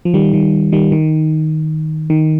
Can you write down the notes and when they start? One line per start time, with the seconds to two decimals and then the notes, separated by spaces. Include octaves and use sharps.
0.05 F3
0.14 D#3 G3
0.33 D#3
0.72 D#3 G3
0.92 D#3
2.10 D#3